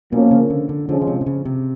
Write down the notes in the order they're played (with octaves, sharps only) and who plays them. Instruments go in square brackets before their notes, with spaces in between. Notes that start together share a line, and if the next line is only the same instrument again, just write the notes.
[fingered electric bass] B2 [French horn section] F3 A#3 C#4
[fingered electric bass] C#3
D3
D3
[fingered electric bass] D3 [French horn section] F3 G#3 C#4
[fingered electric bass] C#3
C3
C3
C#3
C3